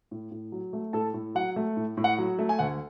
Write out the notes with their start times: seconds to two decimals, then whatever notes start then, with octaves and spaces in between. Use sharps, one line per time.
0.11 A2
0.31 A2
0.52 F#3
0.73 A3
0.93 A2 A4 A5
1.14 A2
1.35 F#3 F#5
1.56 A3
1.77 A2
1.97 A2
2.04 F#5
2.18 F#3
2.39 A3
2.49 G#5
2.59 D2 F#5